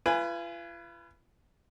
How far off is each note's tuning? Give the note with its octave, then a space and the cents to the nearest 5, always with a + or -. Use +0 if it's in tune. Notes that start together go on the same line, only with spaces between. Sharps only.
F4 -40 B4 +0 G#5 +0